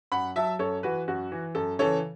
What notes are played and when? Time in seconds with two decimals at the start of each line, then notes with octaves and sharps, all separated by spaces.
0.12 F#2 F#5 B5
0.36 F#3 E5 A5
0.59 F#2 A4 C#5
0.83 E3 F#4 B4
1.08 F#2 F#4
1.32 E3
1.55 F#2 A4
1.79 C#3 E3 A4 C#5